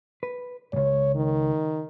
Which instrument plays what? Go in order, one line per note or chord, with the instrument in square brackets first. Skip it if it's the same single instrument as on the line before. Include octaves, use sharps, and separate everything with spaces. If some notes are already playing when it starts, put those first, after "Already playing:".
[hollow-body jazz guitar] B4
[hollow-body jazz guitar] C#2 G#2 [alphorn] C#5
[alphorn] D#3